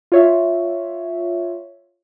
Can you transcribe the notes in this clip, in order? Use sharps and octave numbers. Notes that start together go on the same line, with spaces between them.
F4 C#5 E5